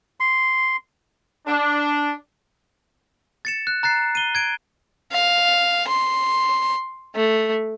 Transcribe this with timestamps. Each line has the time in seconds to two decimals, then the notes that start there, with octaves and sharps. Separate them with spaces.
0.20 C6
1.47 D4
3.45 A6 C#7 E7
3.67 F#6
3.83 A#5 F#6 A6 C7
4.15 D#7 G7
4.35 G#6 D7
5.12 F5
5.88 C6
7.16 A3